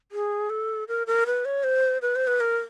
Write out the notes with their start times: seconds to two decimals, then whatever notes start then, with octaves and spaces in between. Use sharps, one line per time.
0.12 G#4
0.50 A4
0.88 A#4
1.07 A#4
1.26 B4
1.45 C#5
1.64 C5
2.02 B4
2.16 C5
2.27 B4
2.40 A#4